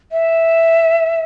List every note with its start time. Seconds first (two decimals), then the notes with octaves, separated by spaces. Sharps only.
0.12 E5